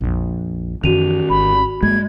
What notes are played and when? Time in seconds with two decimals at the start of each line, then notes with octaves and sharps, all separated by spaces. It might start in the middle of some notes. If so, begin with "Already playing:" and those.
0.01 A#1 F2
0.84 F#2 D#3 E3 C#4 F#4 D#7 F7
1.29 G#1 B5
1.83 G2 G#3 A#3 G#6